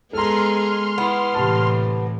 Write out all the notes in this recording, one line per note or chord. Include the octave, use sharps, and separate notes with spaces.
G#3 B3 G#4 A4 A#5 C6 F6
B3 E4
A2 C3 E3 A5